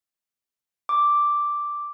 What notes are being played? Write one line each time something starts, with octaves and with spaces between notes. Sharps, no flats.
D6